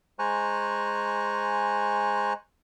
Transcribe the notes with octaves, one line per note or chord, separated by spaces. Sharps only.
G#3 C5 G#5 A#5 C#6 F#6